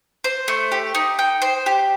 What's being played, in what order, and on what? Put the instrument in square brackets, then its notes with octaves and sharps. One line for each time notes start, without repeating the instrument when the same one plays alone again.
[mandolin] C5
A3
G4
D#4
G5
C5
G4